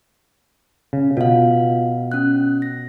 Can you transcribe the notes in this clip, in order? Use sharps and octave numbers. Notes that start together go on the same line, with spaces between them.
C#3
B2 F4 F5
C#4 F#6
A#6